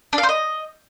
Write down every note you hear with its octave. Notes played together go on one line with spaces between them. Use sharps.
D4
F5
C5
D#5